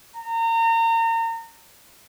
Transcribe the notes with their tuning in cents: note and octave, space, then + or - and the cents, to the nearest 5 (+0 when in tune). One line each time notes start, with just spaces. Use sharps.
A#5 -35